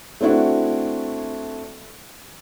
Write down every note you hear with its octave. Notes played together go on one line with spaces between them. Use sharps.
A3 C4 D4 E4 F#4